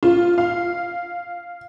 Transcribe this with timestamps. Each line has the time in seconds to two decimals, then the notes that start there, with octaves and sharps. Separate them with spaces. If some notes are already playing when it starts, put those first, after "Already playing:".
0.03 F4
0.38 F5